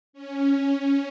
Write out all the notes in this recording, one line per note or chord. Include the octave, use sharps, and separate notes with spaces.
C#4